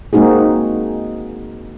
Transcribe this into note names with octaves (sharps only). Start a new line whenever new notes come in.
G#3 A#3 C4 D#4 F#4 G#4